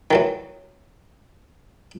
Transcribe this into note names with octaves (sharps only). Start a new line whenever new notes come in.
D#3 E3 F#3